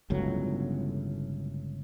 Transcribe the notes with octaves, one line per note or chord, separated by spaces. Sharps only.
G1 C#2 A2 F#3